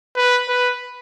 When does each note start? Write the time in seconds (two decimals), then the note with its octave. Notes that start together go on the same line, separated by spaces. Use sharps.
0.16 B4
0.49 B4